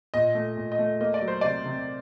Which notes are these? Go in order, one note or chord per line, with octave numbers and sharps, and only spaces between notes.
A#2 D#5
A3
A#2
D#5
A3
A#3 D#5
D5
F#3
C5
C3 D5
C3